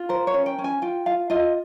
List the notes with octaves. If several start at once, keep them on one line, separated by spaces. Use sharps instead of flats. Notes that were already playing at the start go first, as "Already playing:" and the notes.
Already playing: F4
A#4 C5
C#5
C#4
G5
C#4
G#5
F4 G5
F4 F5
F4 D#5